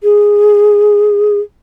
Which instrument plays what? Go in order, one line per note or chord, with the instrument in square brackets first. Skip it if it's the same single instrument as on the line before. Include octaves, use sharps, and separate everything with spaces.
[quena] G#4